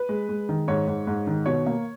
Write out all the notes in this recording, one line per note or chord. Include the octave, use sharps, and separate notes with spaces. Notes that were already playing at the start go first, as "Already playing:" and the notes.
Already playing: B4
G#3
G#3
D#3
G#2 C#5
G#2
G#2
D#3
B2 C#5
A#3